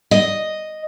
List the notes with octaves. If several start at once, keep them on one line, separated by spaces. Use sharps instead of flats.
D#5